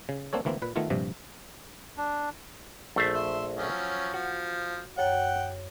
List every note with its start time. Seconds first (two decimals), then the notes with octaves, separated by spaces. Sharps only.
0.09 C#3
0.33 A#3 C4 D4 A4 C#5
0.45 D2 E3 A#3 C4
0.62 A#2 B4
0.76 D#3 A3 B3 E4 F4
0.90 A#1 G2 C3 F3
1.97 D4
2.96 A#1 A3 C5
3.15 E5 C6
3.57 F3 F#3 C#4
4.14 F3 F#4
4.98 F#2 C#5 F#5 G5